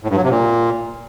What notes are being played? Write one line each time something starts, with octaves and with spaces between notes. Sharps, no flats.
A2
G2
F#3
C3
A#2